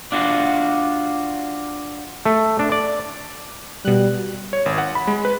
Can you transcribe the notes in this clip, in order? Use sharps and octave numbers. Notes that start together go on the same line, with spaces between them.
D4 F4 F#4
A3
D4
D5
B2 G3 F#6
C#5
G#1
F#5
B5
G#3
B4